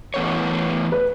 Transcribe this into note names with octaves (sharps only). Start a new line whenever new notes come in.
A2 E3 B3 A4 C#5
B4